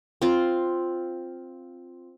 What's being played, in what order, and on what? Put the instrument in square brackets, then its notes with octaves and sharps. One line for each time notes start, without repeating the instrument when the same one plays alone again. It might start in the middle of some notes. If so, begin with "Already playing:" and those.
[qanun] C4 F4